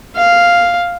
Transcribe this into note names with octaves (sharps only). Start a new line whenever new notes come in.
F5